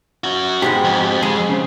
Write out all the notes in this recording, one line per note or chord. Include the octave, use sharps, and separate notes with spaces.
C#4 F#4
G#2 B2 G#3 G4
F2
G#3 G#4
C#3 C4